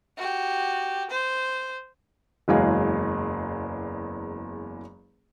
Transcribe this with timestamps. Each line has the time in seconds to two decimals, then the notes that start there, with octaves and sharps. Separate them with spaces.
0.17 F#4 G4
1.10 C5
2.48 F#1 E2 F#3 G#3 G#4 F5